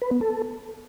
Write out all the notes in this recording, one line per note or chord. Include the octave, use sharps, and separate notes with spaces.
B4
B3
A4